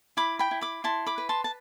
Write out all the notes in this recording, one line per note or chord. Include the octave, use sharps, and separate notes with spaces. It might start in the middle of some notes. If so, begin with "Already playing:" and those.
E4 B5 D6
G5 B5
E4
B5 D6
E4 A5 C6
B5 D6
B4
A5 C6
A5